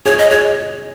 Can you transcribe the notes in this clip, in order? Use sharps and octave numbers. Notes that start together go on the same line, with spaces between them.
G#4 C#5
D#5
G#4 C#5